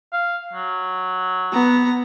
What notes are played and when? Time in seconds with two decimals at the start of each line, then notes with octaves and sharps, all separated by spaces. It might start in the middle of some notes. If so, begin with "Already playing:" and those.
0.13 F5
0.53 F#3
1.52 B3 A#5